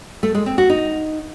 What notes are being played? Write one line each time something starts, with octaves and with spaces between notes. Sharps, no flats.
A3
G#3
C4
F#4
D#4